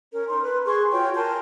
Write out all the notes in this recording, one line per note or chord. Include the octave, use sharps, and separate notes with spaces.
C#4 A#4
D#4 A#4 C6
B4
G#4 C6 C#6
F4 F#4 C#5 G5
A#4 G#5 A5 C6